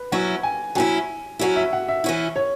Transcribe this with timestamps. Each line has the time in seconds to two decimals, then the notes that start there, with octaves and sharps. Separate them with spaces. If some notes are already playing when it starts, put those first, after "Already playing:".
Already playing: B4
0.12 F#3 C#4 E4 F#5
0.43 G#5
0.75 F#3 C#4 E4 G#5
1.39 F#3 C#4 E4 F#4
1.56 E5
1.73 F#5
1.88 E5
2.04 E3 C#4 E4
2.36 C#5